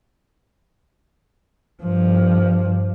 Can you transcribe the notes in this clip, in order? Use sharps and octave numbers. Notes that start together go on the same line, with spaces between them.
G2 F3